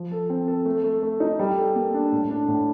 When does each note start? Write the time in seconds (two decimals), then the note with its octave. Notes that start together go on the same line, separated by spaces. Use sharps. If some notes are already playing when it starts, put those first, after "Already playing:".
Already playing: F3
0.11 A4
0.30 C4
0.48 A4
0.65 A3
0.84 A3
1.02 A3
1.20 D#4
1.39 G3
1.57 A4
1.75 A#3
1.94 D4
2.12 A2
2.30 D4
2.48 A2